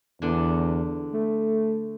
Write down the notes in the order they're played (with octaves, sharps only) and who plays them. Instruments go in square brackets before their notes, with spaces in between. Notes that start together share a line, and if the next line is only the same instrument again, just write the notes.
[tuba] E2 [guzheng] D3 D4
[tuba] A3